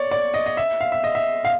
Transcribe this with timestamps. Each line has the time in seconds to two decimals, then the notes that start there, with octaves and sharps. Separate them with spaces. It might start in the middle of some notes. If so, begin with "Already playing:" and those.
Already playing: C#5 D5
0.11 D5
0.34 D#5
0.46 D#5
0.57 E5
0.81 F5
0.92 E5
1.04 D#5
1.15 E5
1.45 F5